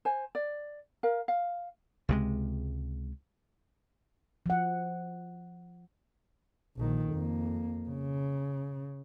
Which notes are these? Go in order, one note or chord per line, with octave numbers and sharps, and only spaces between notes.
C5 G#5
D5
A#4 F5
F5
C#2 C3 G#3
F3 F#5
A#1 D#3
F2 A#3
C#3